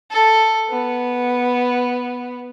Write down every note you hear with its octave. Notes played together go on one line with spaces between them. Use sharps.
A4
B3